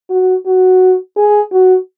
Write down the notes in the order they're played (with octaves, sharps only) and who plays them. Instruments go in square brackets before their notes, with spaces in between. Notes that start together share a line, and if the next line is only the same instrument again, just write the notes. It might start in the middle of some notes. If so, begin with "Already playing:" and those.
[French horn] F#4
F#4
G#4
F#4